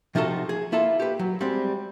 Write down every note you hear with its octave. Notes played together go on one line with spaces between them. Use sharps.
C3 F3 D#4 F4 F#4 A4
G#4
A#3 E4 F4 A4
G4 B4
F#3
G3 G#3 C4